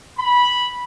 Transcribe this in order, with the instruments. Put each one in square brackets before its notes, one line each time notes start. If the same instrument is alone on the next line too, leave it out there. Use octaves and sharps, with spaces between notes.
[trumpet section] B5